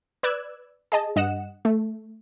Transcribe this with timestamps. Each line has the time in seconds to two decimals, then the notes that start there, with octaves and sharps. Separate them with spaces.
0.23 B4 D5 E6 F#6 G#6
0.92 G#4 D#5 A5
1.16 G2 D#5 F#5 E7
1.65 A3